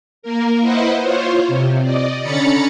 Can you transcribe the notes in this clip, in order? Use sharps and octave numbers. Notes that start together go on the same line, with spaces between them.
A#3 A#4
E4 B4 C5 D#5 F#5
F4 C5 C#5
C3
D5 D#5
D3 C#4 A#5 B5 A6 C#7